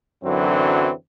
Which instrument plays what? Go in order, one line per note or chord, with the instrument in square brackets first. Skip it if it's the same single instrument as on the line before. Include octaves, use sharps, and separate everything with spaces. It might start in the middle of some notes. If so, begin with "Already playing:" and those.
[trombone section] F#2 D3 E3 F#3 C4